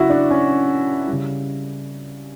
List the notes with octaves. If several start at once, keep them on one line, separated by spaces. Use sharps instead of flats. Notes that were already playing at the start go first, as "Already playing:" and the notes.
Already playing: C#3 F#3 E4 F#4
D4
C#4
C#3 G3